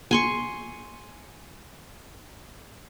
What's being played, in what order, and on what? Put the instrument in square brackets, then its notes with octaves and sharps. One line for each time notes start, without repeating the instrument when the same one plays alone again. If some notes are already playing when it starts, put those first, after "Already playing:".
[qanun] G#5 C6 C#6